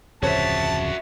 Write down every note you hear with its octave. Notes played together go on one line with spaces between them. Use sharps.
D1 F2 C#3 F#4 C5 C#5 E5 A5